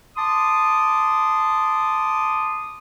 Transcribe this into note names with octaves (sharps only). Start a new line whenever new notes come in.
A5 C6 D6 D#6